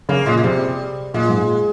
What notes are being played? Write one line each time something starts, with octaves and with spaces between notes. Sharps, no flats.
C#3 A#3
A#2 G#3
G#3
C3 G3
A#2 G#3
G#2
A#2